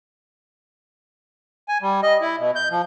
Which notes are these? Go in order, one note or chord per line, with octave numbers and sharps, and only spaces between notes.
G#5
G3
D#5
E4
B2
G6
F3